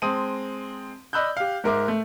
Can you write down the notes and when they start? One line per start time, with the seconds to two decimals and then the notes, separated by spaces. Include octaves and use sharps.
0.02 G#3 C4 A5 D#6 D#7
1.13 D5 D#5 B5 E6 F#6 G6
1.37 G4 F5
1.64 G#2 G#3 A#4 E5 D6
1.88 A3